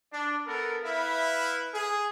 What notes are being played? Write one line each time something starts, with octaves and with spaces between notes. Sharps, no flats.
D4
B3 A4 A#4
E4 B4 E5 F5
G#4